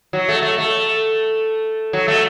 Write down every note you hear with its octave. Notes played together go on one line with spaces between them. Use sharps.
F#3
A3
A3
A3
F#3
A3